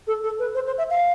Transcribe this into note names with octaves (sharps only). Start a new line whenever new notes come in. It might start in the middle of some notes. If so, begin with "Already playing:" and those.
A4
A4
B4
C5
C5
E5
F5